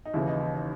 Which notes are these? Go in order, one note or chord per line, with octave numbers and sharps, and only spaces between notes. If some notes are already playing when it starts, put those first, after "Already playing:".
D#4
D#2 C#3 E3 E4
D#4
D#4
D#4